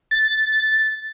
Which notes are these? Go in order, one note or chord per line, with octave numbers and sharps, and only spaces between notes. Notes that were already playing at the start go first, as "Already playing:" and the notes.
A6